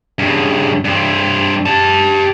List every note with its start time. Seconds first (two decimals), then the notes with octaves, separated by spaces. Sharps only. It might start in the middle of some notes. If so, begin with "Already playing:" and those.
0.19 G2 C#3
0.85 G2 C4
1.66 G4 A5